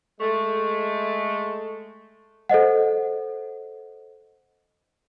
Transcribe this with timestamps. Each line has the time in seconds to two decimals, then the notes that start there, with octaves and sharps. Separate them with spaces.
0.21 G#3 A3
2.49 A4 C5 D#5 F#5